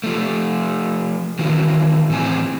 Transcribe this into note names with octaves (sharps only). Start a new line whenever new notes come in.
F3 A3
D#3 E3 C4 F#4
A2 E3 C4 G#5